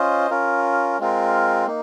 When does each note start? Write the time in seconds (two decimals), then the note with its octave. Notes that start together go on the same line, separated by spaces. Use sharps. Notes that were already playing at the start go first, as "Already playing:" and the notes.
Already playing: C#4 F4 C5 D#5
0.30 C#4 F4 A#4
0.99 G#3 C4 F4 A#4
1.67 A#3 D#4